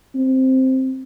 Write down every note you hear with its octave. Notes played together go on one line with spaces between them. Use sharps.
C4